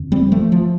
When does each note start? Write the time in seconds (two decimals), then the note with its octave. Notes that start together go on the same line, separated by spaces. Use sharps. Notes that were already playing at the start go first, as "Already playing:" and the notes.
Already playing: F2 D3
0.12 G3 C4
0.32 F3 A3
0.52 F3